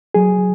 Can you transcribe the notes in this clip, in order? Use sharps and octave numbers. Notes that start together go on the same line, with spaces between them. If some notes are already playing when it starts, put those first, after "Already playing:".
F#3 G#4